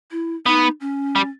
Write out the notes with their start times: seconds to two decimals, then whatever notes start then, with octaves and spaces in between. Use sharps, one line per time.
0.11 E4
0.46 B3 D#4
0.80 C#4
1.16 G3